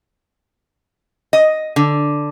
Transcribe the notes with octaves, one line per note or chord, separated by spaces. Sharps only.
D#5
D3